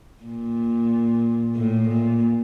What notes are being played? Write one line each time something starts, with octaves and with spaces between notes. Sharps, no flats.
A#2
A2
A#2